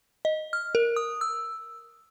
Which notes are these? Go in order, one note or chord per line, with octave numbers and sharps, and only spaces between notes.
D#5
F6
A#4
D#6
E6